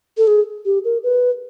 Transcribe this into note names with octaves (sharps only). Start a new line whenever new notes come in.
A4
G#4
G4
A#4
B4